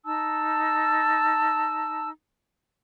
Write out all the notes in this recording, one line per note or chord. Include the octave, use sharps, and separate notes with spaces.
D#4 A5 E6